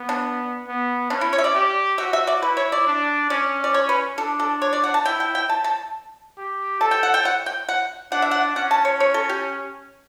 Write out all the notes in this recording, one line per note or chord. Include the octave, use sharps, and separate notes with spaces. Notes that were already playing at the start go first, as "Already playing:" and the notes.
Already playing: B3
D4
B3
C#4 D4
E4
C#5
E5
D5
G4
F#4 E5
E5
D5
E4 B4
C#5
D5
D4
C#4 D5
D5
C#5
B4
D4 A4
A4
C#5
D5
F#5
A5
E4 G5
G5
G5
A5
A5
G4
A4 A5
G5
F#5
G5
F#5
G5
F#5
D4 F#5
E5
F#5
C#4 F#5
A5
C#5
C#5
A4
G4